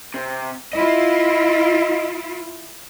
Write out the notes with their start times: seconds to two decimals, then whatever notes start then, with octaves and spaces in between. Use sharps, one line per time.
0.14 C3
0.73 E4 F4 D#5